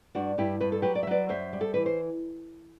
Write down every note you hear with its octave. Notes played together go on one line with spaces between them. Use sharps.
G2 D4 F#4
G2 E4 G4
G2 B4
A4
F#3 G4 B4
D5
E5
F#3 B4 D5
F#2 C5 E5
G3
A4
E3 B4
C5